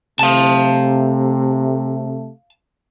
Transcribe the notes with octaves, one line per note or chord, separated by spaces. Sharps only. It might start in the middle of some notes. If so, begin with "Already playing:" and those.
C3 A3 F5 A5